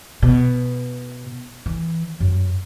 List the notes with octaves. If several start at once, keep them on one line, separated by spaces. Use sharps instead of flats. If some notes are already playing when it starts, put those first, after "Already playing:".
B2
E3
F#2